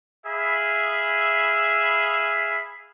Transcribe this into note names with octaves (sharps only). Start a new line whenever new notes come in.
G#4 E5 F5 B5